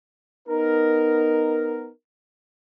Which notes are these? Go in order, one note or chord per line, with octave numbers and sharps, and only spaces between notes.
B3 D#4 A#4